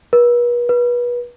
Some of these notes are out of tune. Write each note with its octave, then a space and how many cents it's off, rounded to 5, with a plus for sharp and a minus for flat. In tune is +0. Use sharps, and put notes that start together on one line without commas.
B4 -40
B4 -30